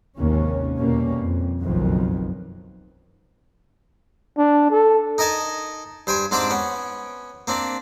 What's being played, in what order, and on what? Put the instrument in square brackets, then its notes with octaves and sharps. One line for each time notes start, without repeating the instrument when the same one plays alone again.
[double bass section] G#1 D#2 C3 C#4
E2 B2 G3 A#3 C#4
F2
F#1 B1 F2 B2 D#3 F#3
[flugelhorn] D4
A4
[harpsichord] D#4 A#4 D#5 G#5 A5
G2 C5 G5 G#5
G#2 C4 D4 C5 G5 D6
B3 C#4
A#3 C4 D4